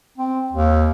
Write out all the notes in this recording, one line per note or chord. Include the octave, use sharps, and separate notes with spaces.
C4
D#2